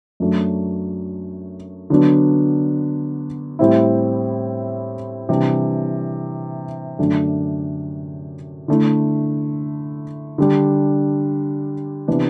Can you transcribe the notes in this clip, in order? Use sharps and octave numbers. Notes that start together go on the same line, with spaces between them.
F#2 F#3 A3 D4
D3 F#3 B3 D4
A2 G3 C4 E4
C3 E3 G3 D4
F#2 D3 A3 D4
D3 A3 E4
D3 G3 D4
C3 E3 B3 D4